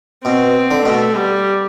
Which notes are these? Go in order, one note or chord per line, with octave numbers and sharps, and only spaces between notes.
B2 C4
D3
B2 A3
G3